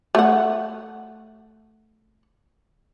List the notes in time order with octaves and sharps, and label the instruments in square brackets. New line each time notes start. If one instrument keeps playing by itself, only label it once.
[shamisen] A3 F#5